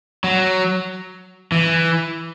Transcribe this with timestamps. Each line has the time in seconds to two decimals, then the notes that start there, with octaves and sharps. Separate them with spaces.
0.24 F#3
1.52 E3